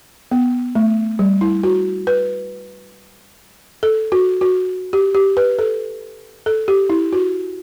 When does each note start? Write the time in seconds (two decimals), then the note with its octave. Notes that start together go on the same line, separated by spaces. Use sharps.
0.31 B3
0.75 A3
1.19 G3
1.41 E4
1.63 F#4
2.07 B4
3.83 A4
4.12 F#4
4.41 F#4
4.93 G4
5.15 G4
5.37 B4
5.59 A4
6.46 A4
6.68 G4
6.90 E4
7.13 F#4